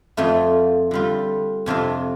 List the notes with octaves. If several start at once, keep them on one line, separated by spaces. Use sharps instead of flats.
F2 F3 A3 F4
D3 G3 F4
F2 C3 F3 D4 F4